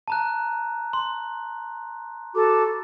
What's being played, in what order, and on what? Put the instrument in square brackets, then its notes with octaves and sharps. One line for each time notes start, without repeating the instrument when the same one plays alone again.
[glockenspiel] A5 A#5 F#6
C6
[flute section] F#4 A4 D6